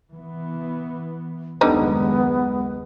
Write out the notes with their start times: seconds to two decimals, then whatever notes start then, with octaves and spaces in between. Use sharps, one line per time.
0.13 E3 B3
1.61 F#1 D#2 D3 G3 G#3 B3 D#4